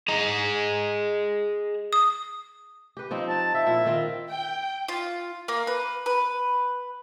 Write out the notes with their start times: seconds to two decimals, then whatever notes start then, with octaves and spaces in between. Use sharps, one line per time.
0.08 G#4 D#5 A#5
1.93 D#6
2.97 G4 B4
3.11 F3 C4 D#4
3.29 A5
3.55 F3 E5
3.66 A#2 E4
3.85 D#3 C4 F4
4.29 G5
4.88 F4
5.48 A#3
5.67 B4
6.06 B4